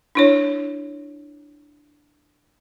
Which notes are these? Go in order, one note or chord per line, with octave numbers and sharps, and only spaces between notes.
D4 E4 C#5